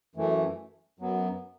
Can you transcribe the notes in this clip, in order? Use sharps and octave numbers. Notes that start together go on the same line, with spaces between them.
F#2 E3 A3
F#2 F#3 B3